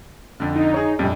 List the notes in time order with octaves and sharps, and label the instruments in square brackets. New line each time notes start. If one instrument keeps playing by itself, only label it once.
[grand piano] F2 D3
[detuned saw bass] D#4
[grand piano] G#4 C#5
[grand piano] A#1 F2 [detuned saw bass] G3